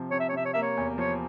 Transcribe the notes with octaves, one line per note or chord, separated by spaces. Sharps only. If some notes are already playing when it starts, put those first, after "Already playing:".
Already playing: C3 F3
C3 C#5
E5
C#5
C3 E5
C#5
A#3 E5
C#5
E2
F3 C#5